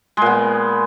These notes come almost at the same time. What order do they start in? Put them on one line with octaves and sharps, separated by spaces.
G#3 A#2 B3